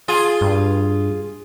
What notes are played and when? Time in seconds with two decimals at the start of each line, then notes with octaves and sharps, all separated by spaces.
0.08 F4 G#4
0.41 G2